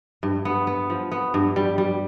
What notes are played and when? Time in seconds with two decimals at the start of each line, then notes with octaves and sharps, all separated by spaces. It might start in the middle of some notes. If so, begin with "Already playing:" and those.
0.23 G2
0.45 B3
0.67 B3
0.90 F3
1.12 B3
1.34 G2
1.56 G3
1.78 G3